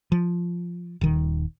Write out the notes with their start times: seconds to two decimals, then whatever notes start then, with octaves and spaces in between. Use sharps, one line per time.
0.12 F3
1.01 D#1 D#3